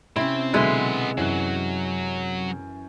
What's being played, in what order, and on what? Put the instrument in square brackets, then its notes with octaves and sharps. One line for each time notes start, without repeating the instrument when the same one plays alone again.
[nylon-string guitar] C3 C#4 [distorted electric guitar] C4 [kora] E4
[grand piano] B2 D3 F#3 [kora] G#3 E4 B4 [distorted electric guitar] B3 C6
[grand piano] F#2 E3 F#6 [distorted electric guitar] F#3